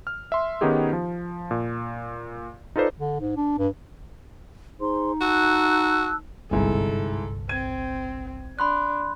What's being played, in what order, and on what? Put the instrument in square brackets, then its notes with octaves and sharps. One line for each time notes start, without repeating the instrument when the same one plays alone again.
[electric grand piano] F6
E5 C6
D#3 B3 C#4 D#4 G4 G#4
F3
A#2
D#4 F4 A4 B4 C5 D5
[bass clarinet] D3
G#2
D4
G2
[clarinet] D#4 [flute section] G#4 C5 C6
[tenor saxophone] F#4 [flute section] A5 E6 F#6
[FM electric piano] G1 C2 [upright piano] G#2 E4 G#5 [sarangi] A4
[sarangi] C4 [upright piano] G#6 D#7
[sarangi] D4 [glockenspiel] B5 C6 F#6